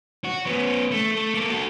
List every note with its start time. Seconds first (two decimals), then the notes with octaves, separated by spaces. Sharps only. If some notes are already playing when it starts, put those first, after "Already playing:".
0.25 F#4
0.46 B3 C#4
0.91 A3
1.12 A3
1.34 A#3 A4
1.50 F#4 A4